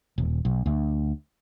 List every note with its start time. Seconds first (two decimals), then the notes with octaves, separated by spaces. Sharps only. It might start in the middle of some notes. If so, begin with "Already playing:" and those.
0.18 D#1
0.45 B1
0.66 D2